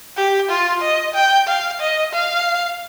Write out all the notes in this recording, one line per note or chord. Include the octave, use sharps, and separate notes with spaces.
G4
F4
D#5
G5
F5
D#5
F5